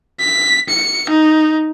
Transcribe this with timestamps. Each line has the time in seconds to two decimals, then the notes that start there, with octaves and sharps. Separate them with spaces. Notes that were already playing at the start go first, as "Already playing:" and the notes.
0.20 B6
0.69 C#7
1.10 D#4